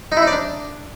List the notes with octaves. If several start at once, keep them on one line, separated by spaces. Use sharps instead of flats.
D#4
E4
D#4
D5
D4